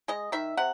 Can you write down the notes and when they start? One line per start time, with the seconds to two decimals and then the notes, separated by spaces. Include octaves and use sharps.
0.08 G#3 D#5
0.32 D#3 E5
0.57 C3 F#5